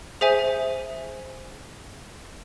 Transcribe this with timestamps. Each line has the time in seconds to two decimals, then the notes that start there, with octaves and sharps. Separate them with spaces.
0.21 G#4 C5 E5 G#5